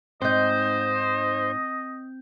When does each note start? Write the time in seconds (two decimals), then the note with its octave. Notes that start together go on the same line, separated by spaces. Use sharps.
0.22 G#2 C4 D#4 C5 D#5 G6